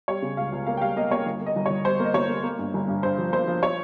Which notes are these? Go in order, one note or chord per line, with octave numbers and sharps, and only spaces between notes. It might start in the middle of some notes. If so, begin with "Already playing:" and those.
G3 C#5
C#3
C#2 F5
C#2
A#3 F5
G5
G3 F5
A#3 D#5
A#3 C#5
G1
A#3
D#5
G1
C#5
G1
G3 C5
A#3
D#5
G1 C#5
A#3
A#3
G2
G1
G2
G2 C5
F3
A#3 C5
F3
C#5